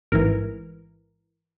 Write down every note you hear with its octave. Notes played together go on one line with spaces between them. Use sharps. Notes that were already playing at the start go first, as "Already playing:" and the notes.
A1 G#2 E3 A#4